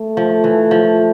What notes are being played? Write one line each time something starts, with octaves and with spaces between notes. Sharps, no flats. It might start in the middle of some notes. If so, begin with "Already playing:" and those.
Already playing: A3
F3
E3
F3